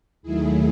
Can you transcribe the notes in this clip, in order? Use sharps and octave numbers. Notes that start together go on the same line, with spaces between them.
D#2 D#3 F#3 A3 E4 G#4